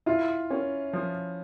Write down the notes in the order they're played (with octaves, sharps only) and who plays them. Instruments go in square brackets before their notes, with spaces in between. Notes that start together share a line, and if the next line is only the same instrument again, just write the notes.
[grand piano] E4 [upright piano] F4
[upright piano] C#4
F3